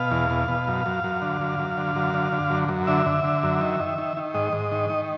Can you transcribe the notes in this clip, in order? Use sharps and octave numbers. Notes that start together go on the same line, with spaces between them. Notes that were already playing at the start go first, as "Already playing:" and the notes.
Already playing: B2 F5
E2
B2
B2
F#2
F#2
F#2
D3
F#2
F#2
D3
F#2
D3
D3
F#2
F#2
D3 E5
D3
D3
F#2
D#3
D#3
D#3
D#3
G#2 D#5
G#2
D#3
D#3